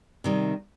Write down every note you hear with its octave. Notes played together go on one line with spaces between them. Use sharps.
C3 D#3 G3